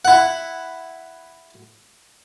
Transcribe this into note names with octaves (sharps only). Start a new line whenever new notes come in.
E4 F#5